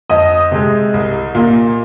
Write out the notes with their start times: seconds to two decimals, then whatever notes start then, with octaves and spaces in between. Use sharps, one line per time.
0.10 F2 D#5 D#6
0.51 C3 G#3
0.94 C2
1.35 A#2 A#3